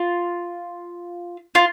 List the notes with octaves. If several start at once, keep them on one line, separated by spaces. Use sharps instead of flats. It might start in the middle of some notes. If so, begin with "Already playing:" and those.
Already playing: F4
F4